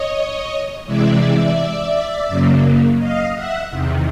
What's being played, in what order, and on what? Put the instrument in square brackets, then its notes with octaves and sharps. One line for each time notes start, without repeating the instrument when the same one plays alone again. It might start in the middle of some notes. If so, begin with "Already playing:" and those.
Already playing: [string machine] C#5 D#5
C3 E3 G#3 D5 E5
F#2 C#3 F#3 A#3
D#5 F5
E5 F#5
E2 C3 D#3